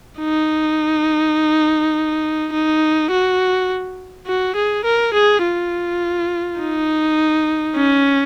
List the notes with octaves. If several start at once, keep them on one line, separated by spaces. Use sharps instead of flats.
D#4
D#4
F#4
F#4
G#4
A#4
G#4
F4
D#4
C#4